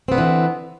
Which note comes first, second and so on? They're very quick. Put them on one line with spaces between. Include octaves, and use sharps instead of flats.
C4 B3 D3 E3